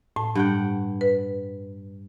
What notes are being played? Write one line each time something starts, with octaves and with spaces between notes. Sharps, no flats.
A2 A5
G2 F#5 G5
B4